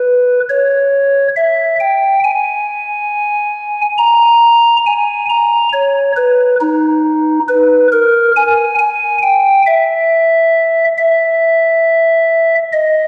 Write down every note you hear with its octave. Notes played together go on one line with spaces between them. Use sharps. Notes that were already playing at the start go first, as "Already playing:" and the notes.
Already playing: B4
C#5
E5
G5
G#5
A#5
G#5
A#5
C#5
B4
D#4
B4
A#4
G#5
G#5
G5
E5
E5
D#5